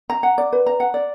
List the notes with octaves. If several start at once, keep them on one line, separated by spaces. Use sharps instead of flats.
A#5
F#5
D5
B4
A#5
F#5
D5